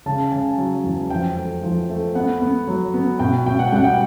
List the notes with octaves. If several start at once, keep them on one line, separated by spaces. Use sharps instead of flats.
C#3 A5
C#3 G#5
F#3
E2
F2 G5
A3
F3
A3
B3 F#5
B3
F#3
B3
B2 G5
B2 G5
F#5
G5
G3 F#5
G5